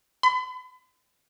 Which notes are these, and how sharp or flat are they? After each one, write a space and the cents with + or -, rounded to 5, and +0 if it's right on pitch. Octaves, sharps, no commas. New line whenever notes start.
B5 +40